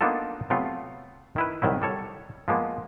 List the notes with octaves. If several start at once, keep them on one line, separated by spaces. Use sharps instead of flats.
A#3 B3 D4 D#4 F4 A4
C3 F#3 A3 B3 F4
D#3 E4 B4
C2 D#3 F#3 E4
G3 A4 C#5
F3 G#3 A#3 B3